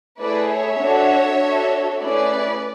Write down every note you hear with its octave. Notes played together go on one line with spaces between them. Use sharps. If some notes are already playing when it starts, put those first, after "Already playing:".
A3 E4 G#4 B4 D5
C#5 E5
D4 F#4 A4
D4 F#4 A4
A3 C#4 E4 G#4 B4 D5